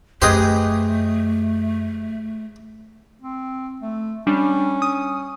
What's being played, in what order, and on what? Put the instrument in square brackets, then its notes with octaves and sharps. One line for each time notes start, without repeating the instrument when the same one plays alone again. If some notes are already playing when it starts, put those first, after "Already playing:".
[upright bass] F#2 [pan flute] A3 [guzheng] G4 G#4 B4 [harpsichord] C5 D#5
[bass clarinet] C4
A3
[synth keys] G3 D4 [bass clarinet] C#4
[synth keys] D#6